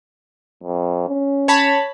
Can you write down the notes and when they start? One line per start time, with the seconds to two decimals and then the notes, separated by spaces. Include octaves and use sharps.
0.63 F2
1.08 C#4
1.48 C#5 A5 B5